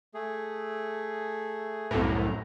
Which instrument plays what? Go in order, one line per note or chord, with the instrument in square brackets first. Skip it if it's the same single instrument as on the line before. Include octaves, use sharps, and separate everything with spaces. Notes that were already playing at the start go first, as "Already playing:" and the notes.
[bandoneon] A3 G#4
[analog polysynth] C2 F#2 A2 [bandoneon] A#5